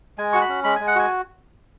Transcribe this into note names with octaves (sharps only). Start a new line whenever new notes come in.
G#3 G#5
F#4 C#6
B5
C#4
G#3 B5
G#3 G#5
F#5
F#4 G#5